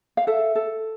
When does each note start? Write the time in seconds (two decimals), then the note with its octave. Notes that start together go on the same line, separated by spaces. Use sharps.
0.17 F5
0.27 A4 E5
0.55 A4